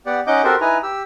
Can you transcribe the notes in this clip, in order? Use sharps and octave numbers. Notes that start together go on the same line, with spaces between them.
B3 G4 D5 F#5
C#4 D#4 D#5 F#5 D6 G6
C4 F#4 G4 A4 A#4 C5
D#4 E4 B4 G#5 A#5
G4 E6